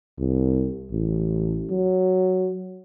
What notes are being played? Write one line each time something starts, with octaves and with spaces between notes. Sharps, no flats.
C2
A1
F#3